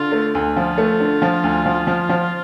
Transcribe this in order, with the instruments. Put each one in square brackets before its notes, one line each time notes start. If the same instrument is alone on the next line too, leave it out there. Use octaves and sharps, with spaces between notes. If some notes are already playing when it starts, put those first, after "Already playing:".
Already playing: [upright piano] D3 [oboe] F4
[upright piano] A3
D2
[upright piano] F3 [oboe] F4
[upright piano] A3
D3
F3
D2
F3
F3
F3